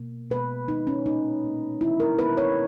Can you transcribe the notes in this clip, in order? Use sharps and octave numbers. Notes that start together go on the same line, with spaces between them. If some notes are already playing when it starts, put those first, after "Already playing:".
Already playing: B2 A#3
B2 G#3 B3 B4
B2 G#3 B3 D#4
C#4
A#2 A#3 D#4
A#2 A#3
D#3 G#3 B3 E4
A#4
D#3 G#3 B3 B4
C#5